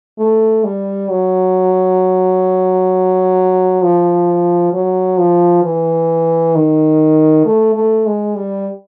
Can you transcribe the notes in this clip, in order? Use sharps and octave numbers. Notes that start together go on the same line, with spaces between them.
A3
G3
F#3
F3
F#3
F3
E3
D#3
A3
A3
G#3
G3